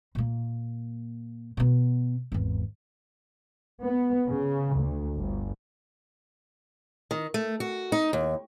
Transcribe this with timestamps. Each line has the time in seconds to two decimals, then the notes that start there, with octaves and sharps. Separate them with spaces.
0.15 A#2 A#3
1.57 B2 B3
2.32 G#1 E2
3.82 B3
4.29 C#3
4.76 D2
5.17 G1
7.11 D#3
7.34 A3
7.60 F#4
7.92 D#4
8.13 D#2